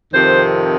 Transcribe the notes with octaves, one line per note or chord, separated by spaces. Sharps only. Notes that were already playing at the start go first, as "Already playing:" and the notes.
F2 C3 D#3 C5